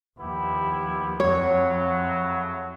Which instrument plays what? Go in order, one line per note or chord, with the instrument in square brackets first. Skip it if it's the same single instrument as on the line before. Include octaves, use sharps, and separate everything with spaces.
[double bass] D#2 F3 [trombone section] B3 E4 G4
[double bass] F2 F3 [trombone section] A2 C#3 F#3 [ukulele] C#5